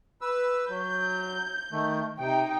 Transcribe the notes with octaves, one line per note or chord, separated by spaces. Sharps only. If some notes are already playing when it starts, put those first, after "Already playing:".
B4 E6
F#3 G6
D#3 A3
C3 D#4 G5